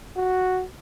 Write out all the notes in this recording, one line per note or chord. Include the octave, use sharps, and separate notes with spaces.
F#4